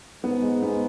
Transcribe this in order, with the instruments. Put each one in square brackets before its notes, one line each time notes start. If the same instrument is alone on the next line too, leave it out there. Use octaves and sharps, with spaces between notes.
[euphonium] G#2 [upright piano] B3
[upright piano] G#3
B3